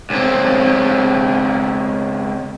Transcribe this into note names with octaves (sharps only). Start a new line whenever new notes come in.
C#2 C4